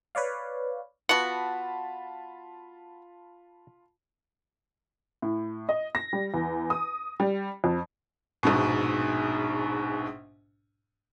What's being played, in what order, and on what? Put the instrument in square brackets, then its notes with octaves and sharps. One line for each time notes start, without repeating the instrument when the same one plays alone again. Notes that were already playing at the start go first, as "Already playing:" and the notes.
[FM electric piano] B4 C#5 D5 F5
[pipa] B3 F#4 [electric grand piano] F4 A5 B5 [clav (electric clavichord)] F#5
[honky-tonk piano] A2
D#5
A#6
G3
E2
D#6
G3
F2
[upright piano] A#1 G#2 B2